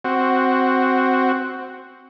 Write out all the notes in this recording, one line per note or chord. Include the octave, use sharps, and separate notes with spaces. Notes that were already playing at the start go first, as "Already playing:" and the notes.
C4 F#4